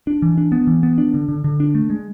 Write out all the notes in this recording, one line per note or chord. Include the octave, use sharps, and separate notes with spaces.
D4
E3
D4
B3
E3
B3
D4
D3
D3
D3
D4
A3
G#3